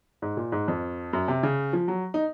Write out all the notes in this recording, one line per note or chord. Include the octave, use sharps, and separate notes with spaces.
G#2
A#2
G#2
F2
F#2
C3
C#3
F3
F#3
D#4